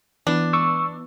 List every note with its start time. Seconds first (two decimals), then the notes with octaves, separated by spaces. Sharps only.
0.27 E3 B3 D4
0.53 C#6 E6